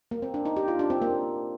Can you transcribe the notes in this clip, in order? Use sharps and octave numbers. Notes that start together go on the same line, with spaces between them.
A#3
C4
D4
D#4
G4
F4
D4
C4
A#3